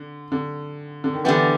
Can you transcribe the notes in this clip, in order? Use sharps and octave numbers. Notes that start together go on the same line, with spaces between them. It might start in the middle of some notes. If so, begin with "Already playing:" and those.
Already playing: D3
D3
D3
D#3
D3 E3 G3 B3